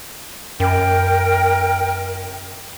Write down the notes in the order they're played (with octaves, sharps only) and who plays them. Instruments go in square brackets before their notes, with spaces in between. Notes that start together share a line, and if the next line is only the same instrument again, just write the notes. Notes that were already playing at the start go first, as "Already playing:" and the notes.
[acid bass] F#2 [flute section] A#4 G5